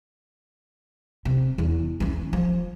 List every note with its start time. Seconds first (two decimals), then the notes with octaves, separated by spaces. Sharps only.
1.25 C3
1.58 E2
2.00 E3 C#4
2.33 F3